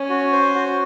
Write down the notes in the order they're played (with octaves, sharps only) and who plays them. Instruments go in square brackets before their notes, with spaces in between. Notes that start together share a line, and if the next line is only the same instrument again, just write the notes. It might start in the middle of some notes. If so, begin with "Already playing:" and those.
Already playing: [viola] C#4
[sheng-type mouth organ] F#4
C5
F#4